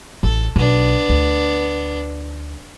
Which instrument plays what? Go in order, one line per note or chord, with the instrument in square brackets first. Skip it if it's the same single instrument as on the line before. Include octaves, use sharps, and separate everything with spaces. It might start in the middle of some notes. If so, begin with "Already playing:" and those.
[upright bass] A1 [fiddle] A4
[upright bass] B1 [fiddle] B3 D4
[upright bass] D2